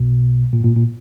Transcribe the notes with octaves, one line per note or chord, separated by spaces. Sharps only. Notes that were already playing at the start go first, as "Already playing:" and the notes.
Already playing: B1 B2
A#2
G#2
A#2
A#2